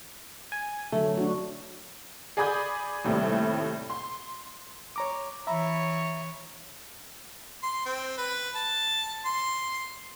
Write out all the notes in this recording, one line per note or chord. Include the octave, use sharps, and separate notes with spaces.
G#5
D3 F#3 A3
D4 F#4
G#4 D5 G#5 B5 D#6 G6
D#2 A2 C3 G3
C6
C#5 A#5 D6
E3 C#5 E5 A#5 B5
C6
C4
B4
A5
C6